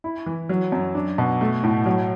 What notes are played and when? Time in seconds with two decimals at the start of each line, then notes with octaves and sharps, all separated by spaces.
0.04 E4
0.26 E3
0.49 F#3
0.72 F#2
0.95 D4
1.18 B2
1.41 A3
1.64 A2
1.86 F#3